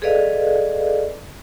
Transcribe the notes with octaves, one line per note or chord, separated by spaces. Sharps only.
G#4 A4 B4 D5 D#5 F5